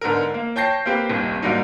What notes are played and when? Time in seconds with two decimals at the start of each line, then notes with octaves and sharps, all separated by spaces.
0.01 G#2 D3 B3 A#4
0.34 A#3
0.56 C#5 G5 A5 G6 A#6 C7
0.86 A#3 C4 G4 B4
1.09 D#1 G#1 D#2 C3
1.42 G#2 F#3 G3 A#3 D4 D#4